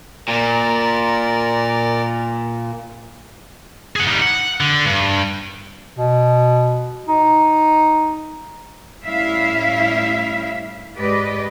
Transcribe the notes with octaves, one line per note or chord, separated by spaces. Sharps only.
A#2 A#4 D5
G#4 F#5
G3 D#4
F#5
D3
G2
B2
D#4
A2 G3 C#4 E4 E5 F5
G#2 G#3 G4 B4 D5 D#5